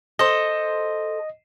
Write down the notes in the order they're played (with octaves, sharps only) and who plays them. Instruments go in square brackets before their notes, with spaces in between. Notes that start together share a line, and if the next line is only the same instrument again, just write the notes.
[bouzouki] A4 C5 [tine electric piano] D#5